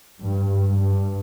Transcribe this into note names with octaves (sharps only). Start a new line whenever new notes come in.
G2
G2